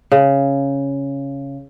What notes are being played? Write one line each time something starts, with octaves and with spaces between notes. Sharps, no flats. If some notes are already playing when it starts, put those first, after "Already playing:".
C#3